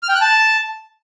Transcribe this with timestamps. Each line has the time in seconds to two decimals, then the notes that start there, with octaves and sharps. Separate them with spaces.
0.03 F6
0.09 G5
0.15 F#6
0.21 A5